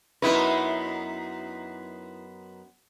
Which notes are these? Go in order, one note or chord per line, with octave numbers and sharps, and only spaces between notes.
F#2 B3 D#4 E4 B4